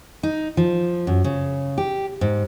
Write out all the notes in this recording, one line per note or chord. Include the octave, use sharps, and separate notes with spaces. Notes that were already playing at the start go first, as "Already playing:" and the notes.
D#4
F3
F#2
C#3
G4
G#2